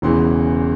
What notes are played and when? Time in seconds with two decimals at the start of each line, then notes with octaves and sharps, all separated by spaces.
0.02 E1 E2 C#3 E3 C6